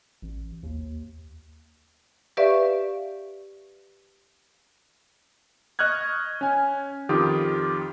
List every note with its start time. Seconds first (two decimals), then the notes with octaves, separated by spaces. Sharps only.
0.22 A1
0.63 D#2
2.37 G4 B4 D5 E5 F5 C#6
5.79 D#5 C#6 F6 F#6 G#6
6.41 C#4 G#5
7.09 F2 D#3 F4 G4 D#6